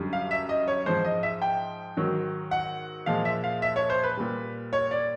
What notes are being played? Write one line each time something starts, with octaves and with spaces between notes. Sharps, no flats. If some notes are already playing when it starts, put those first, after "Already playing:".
Already playing: F#2 D3 G3
F5
E5
D#5
C#5
G#2 F3 G#3 C5
D#5
E5
G5
G#2 D#3 F#3
F#5
A#2 F3 G#3 F5
E5
F5
E5
C#5
C5
B4
A#2 G3
C#5
D5